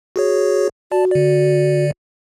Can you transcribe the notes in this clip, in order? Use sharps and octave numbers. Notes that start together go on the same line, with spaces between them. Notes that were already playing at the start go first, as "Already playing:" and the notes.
F#4 G#4 C#5
F#4 D5 A5
D3 D5